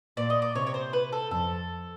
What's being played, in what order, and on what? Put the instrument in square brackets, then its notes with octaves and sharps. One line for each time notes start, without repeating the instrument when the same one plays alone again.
[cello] A#2 [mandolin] D5
[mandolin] D#5
D5
[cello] C3 [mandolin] C#5
[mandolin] C#5
C5
B4
A4
[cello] F2 [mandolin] A4